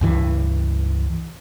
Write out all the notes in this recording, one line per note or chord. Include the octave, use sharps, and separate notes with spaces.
C#2 G2 E3